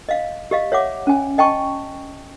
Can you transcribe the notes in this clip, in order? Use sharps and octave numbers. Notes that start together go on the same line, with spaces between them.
D#5 F5
G4 D#5 F5
C#5 E5 F#5 D6
C#4 G#5
D#5 G5 A5 C#6